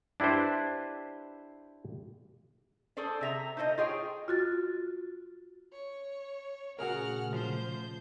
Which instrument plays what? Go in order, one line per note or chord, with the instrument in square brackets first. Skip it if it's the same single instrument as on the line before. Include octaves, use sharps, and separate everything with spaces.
[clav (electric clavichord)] D4 E4 G4 B4 C5
[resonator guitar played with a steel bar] G#4 A4 C5 D5
C3 E5 A#5
D#4 A4 C5 D5 D#5
F4 G#4 C#5 G5
[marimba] F4 F#4 A6
[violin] C#5
[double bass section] A#2 C#3 A3 [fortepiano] F#4 G#4 A#4 [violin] F#5 F6
[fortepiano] F3 [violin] C5 G6